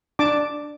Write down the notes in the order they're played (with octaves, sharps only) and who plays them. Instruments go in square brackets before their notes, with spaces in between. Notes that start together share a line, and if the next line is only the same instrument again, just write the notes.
[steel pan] D4 A5 D6